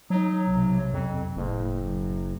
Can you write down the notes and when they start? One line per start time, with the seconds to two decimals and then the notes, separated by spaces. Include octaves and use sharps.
0.10 F#3 D#4
0.46 B1 C3
0.93 F2
1.36 F#1 A2
1.82 F#2